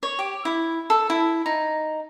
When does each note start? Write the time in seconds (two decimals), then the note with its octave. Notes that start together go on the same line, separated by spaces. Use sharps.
0.03 C#5
0.19 G4
0.45 E4
0.90 A4
1.10 E4
1.46 D#4